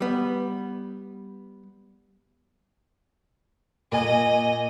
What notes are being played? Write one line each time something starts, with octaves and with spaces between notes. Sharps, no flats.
G3 B3
A#2 D#5 G#5